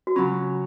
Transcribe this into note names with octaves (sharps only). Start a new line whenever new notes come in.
F#4
C#3 F#3 C#4 F4